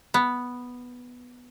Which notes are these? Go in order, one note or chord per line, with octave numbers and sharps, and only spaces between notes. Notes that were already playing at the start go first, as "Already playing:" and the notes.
B3